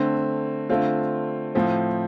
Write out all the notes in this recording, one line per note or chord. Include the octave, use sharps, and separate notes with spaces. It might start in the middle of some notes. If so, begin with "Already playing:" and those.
Already playing: D3 A3 C4
D3 A3 C4 F4
A2 F3 C4